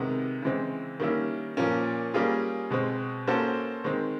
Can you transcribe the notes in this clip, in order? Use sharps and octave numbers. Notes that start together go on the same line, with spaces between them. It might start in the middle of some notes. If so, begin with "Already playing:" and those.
Already playing: C3 D#3 G#3 B3
C#3 E3 G#3 C4
D#3 G3 A#3 C#4 E4
A#2 F3 A#3 C#4
G3 A#3 C#4 F4 G#4
B2 G#3 C4
A#3 C#4 F#4 A4 C5
D#3 G#3 C4